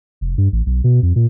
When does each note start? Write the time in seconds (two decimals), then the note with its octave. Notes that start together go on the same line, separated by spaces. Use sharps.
0.21 F1
0.38 G2
0.52 A1
0.66 B1
0.84 B2
1.02 F2
1.16 A#2